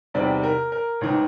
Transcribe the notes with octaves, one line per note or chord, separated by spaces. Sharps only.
E2 C3 D#3 G3 C4 D5
A#4
A#4
A1 G#2 D#3